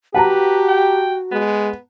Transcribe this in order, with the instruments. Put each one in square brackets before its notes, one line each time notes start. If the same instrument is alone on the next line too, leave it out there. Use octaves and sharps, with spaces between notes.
[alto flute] F#4 [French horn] G4 [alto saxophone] B4 [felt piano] F#5 A5 A#5
[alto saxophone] G5
[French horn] G#3 [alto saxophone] B3